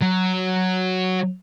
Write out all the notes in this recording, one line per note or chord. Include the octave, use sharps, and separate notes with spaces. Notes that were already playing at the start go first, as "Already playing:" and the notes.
F#3